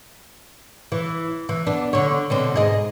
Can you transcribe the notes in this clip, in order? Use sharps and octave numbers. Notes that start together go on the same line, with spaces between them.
E3
E3
B3 D4
D3 C#5
B2 D3 C4
G#2 G#4 D#5